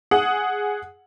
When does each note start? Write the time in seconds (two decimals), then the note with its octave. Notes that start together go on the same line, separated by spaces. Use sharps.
0.11 G#4 F#5 D#6